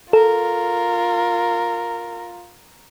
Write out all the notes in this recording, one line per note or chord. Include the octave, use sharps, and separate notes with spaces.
F4 A4 A#4